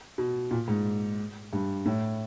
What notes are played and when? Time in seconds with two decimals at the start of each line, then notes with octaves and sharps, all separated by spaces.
0.18 B2
0.51 A#2
0.68 G#2
1.53 G2
1.86 A2